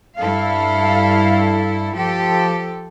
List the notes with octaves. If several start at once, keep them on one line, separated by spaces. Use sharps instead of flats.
G2 E4 A4 F5
F3 G4 A4